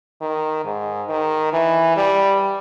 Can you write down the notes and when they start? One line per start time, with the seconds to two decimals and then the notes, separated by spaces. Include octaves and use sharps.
0.21 D#3
0.65 G#2
1.09 D#3
1.53 E3
1.97 G3